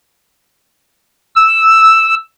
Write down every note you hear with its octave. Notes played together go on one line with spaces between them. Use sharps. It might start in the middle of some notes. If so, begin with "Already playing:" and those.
E6